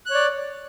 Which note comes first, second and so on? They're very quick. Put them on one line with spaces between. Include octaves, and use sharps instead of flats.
F#6 C#5 D5